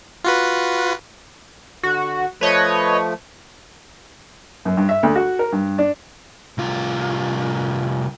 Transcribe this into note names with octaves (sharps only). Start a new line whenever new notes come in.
F4 F#4 B4
D3 F#4
F3 A3 B4 C#5 D#5
F#2
G2
E5
D2
F#4
A#4
G2
D4
C2 F4